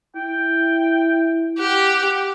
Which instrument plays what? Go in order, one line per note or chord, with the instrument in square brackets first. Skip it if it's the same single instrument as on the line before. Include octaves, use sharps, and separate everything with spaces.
[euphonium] E4 [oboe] G5
[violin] G4 [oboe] F#5